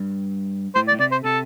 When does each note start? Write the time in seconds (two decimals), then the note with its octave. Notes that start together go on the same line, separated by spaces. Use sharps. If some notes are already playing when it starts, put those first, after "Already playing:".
Already playing: G2
0.75 A2 C5
0.88 D5
0.93 A2
1.00 C3 D5
1.12 C5
1.24 C3 A4